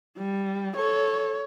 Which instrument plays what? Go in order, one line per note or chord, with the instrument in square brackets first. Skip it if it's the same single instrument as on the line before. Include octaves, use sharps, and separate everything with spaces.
[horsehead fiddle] G3
[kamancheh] A4 [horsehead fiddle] C#5